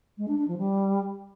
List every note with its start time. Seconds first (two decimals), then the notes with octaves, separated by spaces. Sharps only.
0.18 G#3
0.28 D4
0.38 D4
0.48 F3
0.58 G3